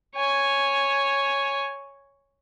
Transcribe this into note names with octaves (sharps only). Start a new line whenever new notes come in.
C#5 G#5